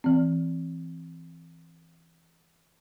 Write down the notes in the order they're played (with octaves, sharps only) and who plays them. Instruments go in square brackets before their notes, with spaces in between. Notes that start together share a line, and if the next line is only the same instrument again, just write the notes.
[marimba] E3 C4